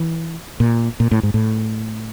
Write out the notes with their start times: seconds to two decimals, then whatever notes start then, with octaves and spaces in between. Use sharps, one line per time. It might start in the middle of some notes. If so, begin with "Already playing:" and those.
Already playing: E3
0.60 A#2
1.00 A#2
1.11 A2
1.23 G#2
1.34 A2